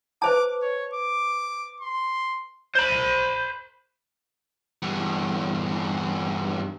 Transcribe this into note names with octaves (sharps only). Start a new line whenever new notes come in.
B4 C5 A5 D6
C#5
D6
C6
C5 B5
E2 G2